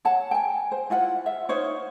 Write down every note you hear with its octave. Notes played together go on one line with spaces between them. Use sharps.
C#5 F#5 A5
G5 G#5
C5
E4 F4 F#5
E5 F5
D#4 C5 C#5 F5